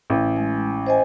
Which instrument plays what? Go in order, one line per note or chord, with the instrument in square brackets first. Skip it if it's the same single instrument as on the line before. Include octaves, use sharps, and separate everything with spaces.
[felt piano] A1
[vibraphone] G#3
C5 D#5 G#5